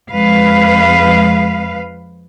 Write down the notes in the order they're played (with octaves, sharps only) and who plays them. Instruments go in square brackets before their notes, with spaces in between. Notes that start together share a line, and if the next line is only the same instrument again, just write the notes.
[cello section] F2 G#3 B4 F5